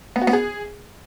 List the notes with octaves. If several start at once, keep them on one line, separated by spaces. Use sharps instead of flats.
B3
F#4
B3
G#4